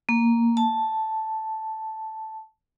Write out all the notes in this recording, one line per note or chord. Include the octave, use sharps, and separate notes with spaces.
A#3
A5